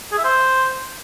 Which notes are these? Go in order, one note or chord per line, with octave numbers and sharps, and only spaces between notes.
G#4
E5
C5